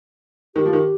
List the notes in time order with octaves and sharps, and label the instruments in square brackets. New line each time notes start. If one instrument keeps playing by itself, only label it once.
[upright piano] D#3 [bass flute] G4
[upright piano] F3
D#3